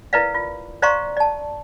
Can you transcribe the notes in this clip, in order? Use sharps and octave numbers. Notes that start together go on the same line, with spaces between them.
E4 A#4 B4 D5 F5
F4
C5 D5 F5 A#5 C6 C#6
D5 A5